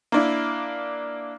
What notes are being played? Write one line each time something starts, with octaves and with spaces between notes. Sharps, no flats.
A#3 D4 E4